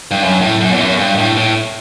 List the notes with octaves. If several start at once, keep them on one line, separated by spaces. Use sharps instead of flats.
G2
F#2
A2
F#2
E2
F#2
G2
A2
A2